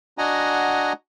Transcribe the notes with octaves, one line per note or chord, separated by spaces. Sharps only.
D4 F#4 D#5 F#5 G#5 A#5